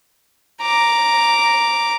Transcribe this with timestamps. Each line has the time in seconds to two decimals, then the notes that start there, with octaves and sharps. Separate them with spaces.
0.62 A#5 D6